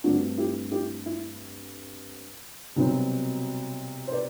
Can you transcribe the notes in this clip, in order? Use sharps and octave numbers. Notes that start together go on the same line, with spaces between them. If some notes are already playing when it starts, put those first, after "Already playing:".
G2 D3 A3 C4 D4 F#4
E4 G4
E4 G4
E4
C2 B2 F#3 C4
C5
B4 D5